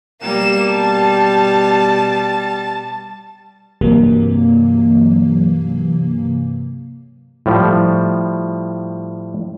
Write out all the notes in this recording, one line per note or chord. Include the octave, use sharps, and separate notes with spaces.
B2 G3 A#3 E7
A5
G2 C3 E3 F#3 A#3
A2 F3 G3